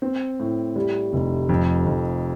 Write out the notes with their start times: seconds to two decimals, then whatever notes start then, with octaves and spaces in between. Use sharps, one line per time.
0.02 C4
0.40 A2
0.76 G3
1.13 F1
1.49 F2
1.87 F2